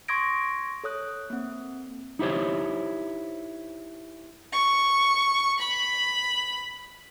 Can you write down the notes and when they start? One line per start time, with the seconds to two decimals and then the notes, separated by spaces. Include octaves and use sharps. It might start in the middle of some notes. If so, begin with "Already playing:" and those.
0.08 C6 C#6 D#6 G#6 A#6 D7
0.84 A4 C#5 D#6 F#6
1.30 A#3 C4
2.19 D#4 E4 G4 C5 C#5
4.53 C#6
5.59 B5